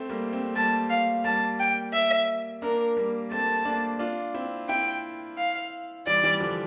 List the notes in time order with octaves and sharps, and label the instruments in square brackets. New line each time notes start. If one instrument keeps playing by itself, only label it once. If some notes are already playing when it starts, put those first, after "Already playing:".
Already playing: [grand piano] A3 C4
G3 A#3
A3 C4
[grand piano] G3 A#3 [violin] A5
[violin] F5
[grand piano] G3 A#3 [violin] A5
[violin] G5
E5
[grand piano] A#3 D4 [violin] A#4
[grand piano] G3 A#3
[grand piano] A3 C4 [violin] A5
[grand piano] A#3 D4
D4 F4
C4 E4
[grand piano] C4 E4 [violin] G5
[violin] F5
[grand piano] E3 G3 [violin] D5
[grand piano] E3 G3
D3 F3